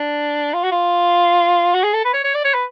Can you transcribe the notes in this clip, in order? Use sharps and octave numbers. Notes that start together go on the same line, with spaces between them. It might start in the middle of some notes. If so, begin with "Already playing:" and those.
Already playing: D4
F4
F#4
F4
F#4
G#4
A4
B4
C#5
C#5
D5
C#5
B4